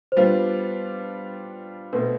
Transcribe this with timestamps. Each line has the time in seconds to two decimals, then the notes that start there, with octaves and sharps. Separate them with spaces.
0.12 C5
0.17 G3 B3 D4 F4 B4
1.93 B2 A3 C4 B4